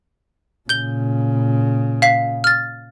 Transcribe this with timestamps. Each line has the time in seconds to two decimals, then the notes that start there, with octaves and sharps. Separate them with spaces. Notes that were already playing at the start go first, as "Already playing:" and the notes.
0.69 A#2 C#3 G6 G7
2.02 F5 B6
2.44 F6 A6